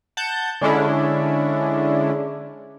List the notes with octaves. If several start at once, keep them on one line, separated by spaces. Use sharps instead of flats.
F#5 A5 G6
D3 G#3 C#4 D4 E4